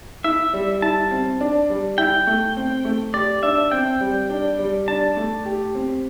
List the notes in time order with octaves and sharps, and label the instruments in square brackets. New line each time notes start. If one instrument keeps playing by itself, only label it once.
[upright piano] E4 [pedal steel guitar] E5
[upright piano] G3
[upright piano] E4 [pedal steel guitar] A5
[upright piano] C4
D4
G3
[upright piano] E4 [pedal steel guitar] G5
[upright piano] A3
C4
A3
[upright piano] G4 [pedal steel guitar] D5
[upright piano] D4 [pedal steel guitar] E5
[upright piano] C4 [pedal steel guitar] G5
[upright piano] G3
D4
G3
[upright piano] D4 [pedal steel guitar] A5
[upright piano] A3
G4
C4